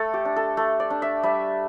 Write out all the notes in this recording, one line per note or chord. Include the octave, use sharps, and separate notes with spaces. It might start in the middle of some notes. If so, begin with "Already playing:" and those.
Already playing: A3 A4
G4
D4
A4
A3
D5
D4
E5
G3 E5